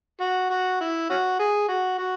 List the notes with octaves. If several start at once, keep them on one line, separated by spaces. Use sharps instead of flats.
F#4
F#4
E4
C#4 F#4
G#4
F#4
F#4